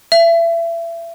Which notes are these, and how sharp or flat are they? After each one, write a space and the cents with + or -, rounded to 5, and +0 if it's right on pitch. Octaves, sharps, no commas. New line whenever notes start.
E5 +30